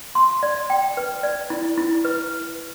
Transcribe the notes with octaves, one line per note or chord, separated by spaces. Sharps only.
C6
D5
G5
B4
D5
E4
E4
B4